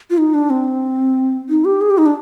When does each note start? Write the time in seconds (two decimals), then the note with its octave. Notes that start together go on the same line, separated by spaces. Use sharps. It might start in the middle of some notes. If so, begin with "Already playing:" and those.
0.10 F4
0.18 D#4
0.34 D4
0.50 C4
1.49 D#4
1.65 G4
1.81 G#4
1.90 G4
1.98 D#4
2.06 D4